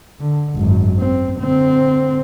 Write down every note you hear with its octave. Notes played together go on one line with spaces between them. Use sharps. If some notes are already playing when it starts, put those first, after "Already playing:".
D3
G#1 F#2
C4
D3 C4